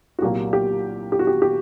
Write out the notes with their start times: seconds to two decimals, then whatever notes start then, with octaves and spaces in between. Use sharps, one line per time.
0.19 F#4
0.22 C2 A#2 F#3 A#3 G4
0.53 G4
1.12 G4
1.19 F#4
1.27 G4
1.42 G4